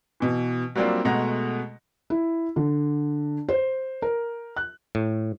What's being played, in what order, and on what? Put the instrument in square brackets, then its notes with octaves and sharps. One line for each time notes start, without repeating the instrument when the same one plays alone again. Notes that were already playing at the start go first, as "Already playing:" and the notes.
[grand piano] B2 E3
F#3 G3 A#3 C4 D4 F4
B2 G#3 A3 F#5 A#5 A#6
[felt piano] E4
D3
C5
A#4
F#6
[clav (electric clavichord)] A2